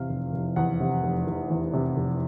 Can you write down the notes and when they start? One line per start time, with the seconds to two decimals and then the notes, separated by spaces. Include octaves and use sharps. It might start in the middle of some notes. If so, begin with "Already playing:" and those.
Already playing: E2 C3 F5
0.09 F1
0.33 F1
0.56 E2 F#5
0.80 C3
1.03 F1
1.27 F1
1.50 E2
1.74 C3
1.97 F1